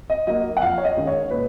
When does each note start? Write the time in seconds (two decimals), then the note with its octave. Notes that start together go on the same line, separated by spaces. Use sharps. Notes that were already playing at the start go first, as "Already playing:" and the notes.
0.10 D#5
0.27 F#3 A#3 D#5
0.57 F#5
0.62 F2 F5
0.78 C#5
0.84 D#5
0.96 D#3 G#3 C#4
1.07 C#5
1.30 A#2 B4